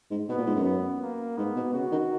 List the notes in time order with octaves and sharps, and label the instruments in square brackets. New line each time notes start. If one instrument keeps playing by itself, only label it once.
[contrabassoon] G#2
[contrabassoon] B2 [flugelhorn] B3
[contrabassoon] A#2
G#2
F#2
[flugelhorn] B3
A#3
[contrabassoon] G#2 [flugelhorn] B3
[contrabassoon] B2
[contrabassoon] C#3 [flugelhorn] F#4
[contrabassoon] D#3